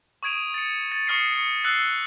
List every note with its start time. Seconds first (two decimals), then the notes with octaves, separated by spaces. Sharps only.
0.23 C#6 D#6 G#6 D7 D#7 F7
0.54 A6 C#7
0.92 A6
1.07 C#6 D#6 F6 A#6 C7 C#7
1.33 C#7
1.64 E6 F#6 A6 C7 C#7